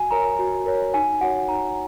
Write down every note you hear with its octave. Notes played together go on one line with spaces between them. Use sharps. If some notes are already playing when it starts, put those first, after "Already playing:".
Already playing: F#4 G#5
A#4 C#5 A#5
F#4
A#4 C#5
D#4 G#5
F#4 C#5 F#5
D#4 A#5